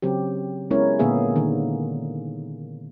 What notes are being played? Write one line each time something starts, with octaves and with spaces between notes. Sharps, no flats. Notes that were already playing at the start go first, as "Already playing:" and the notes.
C#3 F#3 C4 G4
G#3 B3 C#4 E4 A#4 C#5
A#2 D3 A#3 B3 G#4 E5
D3 D#3 D4